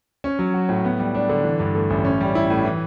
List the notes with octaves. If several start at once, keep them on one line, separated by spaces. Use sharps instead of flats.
C#4
F#3
F#4
A2
B3
G3
D4
D3
E3
G2
A3
A1
C#4
G3
E4
A2
E3